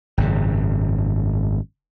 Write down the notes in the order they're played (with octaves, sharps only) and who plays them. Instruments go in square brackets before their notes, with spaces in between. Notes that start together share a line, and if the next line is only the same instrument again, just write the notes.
[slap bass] G#1 F#2 C#3